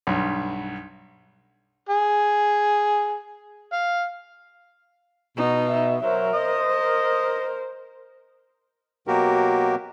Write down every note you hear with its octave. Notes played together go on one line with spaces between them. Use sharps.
B1 G2
G#4
F5
B2 D#4
E5
F#3 A#4 C5 E5
C5 D#5
A#4
B2 F#3 A#3 F#4 G4 A#4